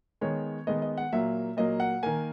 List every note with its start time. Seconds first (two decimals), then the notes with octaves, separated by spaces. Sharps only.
0.21 D#3 G#3 B3 C#5
0.67 D#3 G#3 B3 D#5
0.82 D#5
0.98 F#5
1.13 A#2 F#3 A#3 E5
1.57 A#2 F#3 A#3 D#5
1.80 F#5
2.03 D#3 A#3 G#5